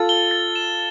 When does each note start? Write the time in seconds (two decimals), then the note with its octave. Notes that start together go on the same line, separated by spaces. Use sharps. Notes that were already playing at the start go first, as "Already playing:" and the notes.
Already playing: F4 A4 A6
0.09 G7
0.31 A6
0.56 E7